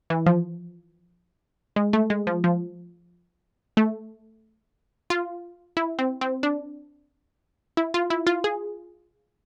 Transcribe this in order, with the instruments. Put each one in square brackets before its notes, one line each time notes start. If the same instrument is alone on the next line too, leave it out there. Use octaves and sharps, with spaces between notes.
[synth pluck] E3
F3
G#3
A3
G#3
F3
F3
A3
F4
E4
C4
C4
D4
E4
F4
E4
F4
G#4